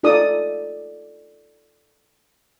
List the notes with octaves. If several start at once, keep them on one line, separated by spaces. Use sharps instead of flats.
D#4 F4 A4 D5 D#6